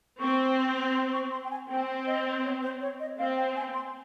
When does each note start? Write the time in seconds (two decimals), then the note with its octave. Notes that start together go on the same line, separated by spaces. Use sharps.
0.20 C4 C#6
0.95 C6
1.13 C#6
1.32 C6
1.44 G5
1.51 G#5
1.69 C4 G5
2.07 D#5
2.39 C5
2.44 C#5
2.63 C5
2.81 C#5
3.00 D#5
3.19 C4 F5
3.37 G5
3.56 G#5
3.74 C6